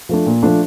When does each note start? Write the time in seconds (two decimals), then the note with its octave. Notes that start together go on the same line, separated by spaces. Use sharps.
0.09 F3 A3 D4
0.26 A#2
0.43 F3 A3 D4